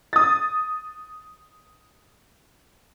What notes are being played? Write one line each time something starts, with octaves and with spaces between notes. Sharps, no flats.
D#6 A6